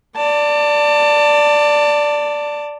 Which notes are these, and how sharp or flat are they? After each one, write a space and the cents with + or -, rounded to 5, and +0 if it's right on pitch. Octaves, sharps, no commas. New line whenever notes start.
D5 +0 A5 +25